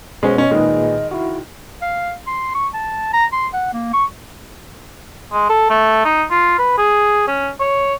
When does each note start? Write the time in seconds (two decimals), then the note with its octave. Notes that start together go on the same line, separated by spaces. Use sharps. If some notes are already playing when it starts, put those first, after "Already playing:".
0.23 B2 G#3 B3 C#4 C5
0.38 C#4 D#5
0.51 A#2 D#3 G#3 G#4 B4
1.11 E4 F#4
1.82 F5
2.27 C6
2.55 C#6
2.74 A5
3.13 A#5
3.33 C6
3.54 F#5
3.73 A#3
3.93 C#6
5.32 G#3
5.49 A4
5.70 A3
6.05 D#4
6.30 F4
6.58 B4
6.78 G#4
7.28 C#4
7.60 C#5